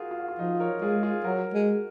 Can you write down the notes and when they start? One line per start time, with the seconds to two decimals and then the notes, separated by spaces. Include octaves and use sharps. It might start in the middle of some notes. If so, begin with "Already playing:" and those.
Already playing: F4 F#4 G#4 A#4
0.11 F4
0.20 F#4
0.29 F4
0.39 F3 D#4
0.60 A#4 C#5
0.82 G#3 F4 G#4
1.03 F4 G#4
1.24 F#3 F#4 A#4
1.53 G#3